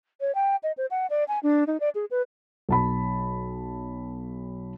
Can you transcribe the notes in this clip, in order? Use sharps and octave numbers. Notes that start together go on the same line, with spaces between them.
C#5
G5
D#5
C5
F#5
D5
G#5
D4
D#4
D5
G#4
B4
B1 A5 B5